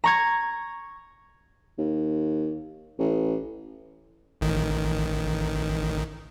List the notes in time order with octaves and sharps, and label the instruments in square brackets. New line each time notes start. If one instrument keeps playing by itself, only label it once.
[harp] A#5 C#6 G#6
[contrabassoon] D#2
A1
[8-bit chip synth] A1 D#3